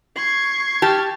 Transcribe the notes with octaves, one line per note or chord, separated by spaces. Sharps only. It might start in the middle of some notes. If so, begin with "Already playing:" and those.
C#6 G#6 C7
G4 A5 F6